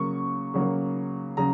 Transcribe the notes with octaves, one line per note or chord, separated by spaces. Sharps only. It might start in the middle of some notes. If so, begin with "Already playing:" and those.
Already playing: C#3 F#3 A#3 C#6
C#3 F#3 A#3
C#3 F#3 A#5